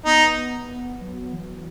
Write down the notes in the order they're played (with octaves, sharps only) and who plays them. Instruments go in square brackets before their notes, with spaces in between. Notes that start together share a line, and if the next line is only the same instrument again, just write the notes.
[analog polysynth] B3 [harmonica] D#4
[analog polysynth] B3
B3
F#3
E3